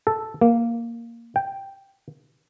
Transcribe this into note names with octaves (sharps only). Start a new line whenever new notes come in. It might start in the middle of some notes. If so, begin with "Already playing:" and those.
A4
A#3
G5